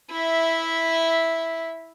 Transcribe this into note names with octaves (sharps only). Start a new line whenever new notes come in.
E4 E5